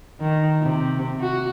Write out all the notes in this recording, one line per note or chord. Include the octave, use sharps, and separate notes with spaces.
D#3
C3
F#4